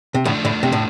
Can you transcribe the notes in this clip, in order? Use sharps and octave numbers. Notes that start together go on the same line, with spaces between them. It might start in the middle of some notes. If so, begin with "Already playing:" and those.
C3
F2 A2 D3 F3 A3 D4
A2 D3
C3
A2